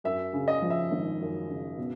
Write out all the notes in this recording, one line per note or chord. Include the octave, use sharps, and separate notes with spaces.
F#2 E5
C#3
D#5
F3
E5
G#1
F#2
C#3
B2